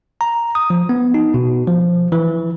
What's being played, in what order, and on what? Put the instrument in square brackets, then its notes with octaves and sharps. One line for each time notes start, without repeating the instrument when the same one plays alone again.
[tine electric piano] A#5
D#6
F3
B3
D#4
B2
F3
E3